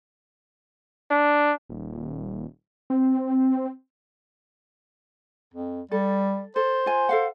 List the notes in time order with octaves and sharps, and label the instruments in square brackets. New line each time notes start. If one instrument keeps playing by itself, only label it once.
[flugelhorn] D4
[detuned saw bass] D#1
C4
[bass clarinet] F2
[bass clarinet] G3 [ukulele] A4
[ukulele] A4 [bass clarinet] C5
[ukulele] F4 G#5
A4 F5 F#5